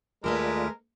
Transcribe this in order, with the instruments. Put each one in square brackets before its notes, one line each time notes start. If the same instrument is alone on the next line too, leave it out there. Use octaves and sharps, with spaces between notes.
[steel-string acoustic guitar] D#2 A3 B4 [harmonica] G#3 [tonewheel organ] F4 D5 [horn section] A#4